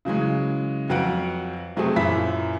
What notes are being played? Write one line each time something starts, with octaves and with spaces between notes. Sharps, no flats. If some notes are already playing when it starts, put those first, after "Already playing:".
C#3 E3 F#3 G#3
F2 F#3 B4 F5 F#5 D7
C3 F#3 A3 C4 G#4
F#2 A#2 E3 E5 B5 B6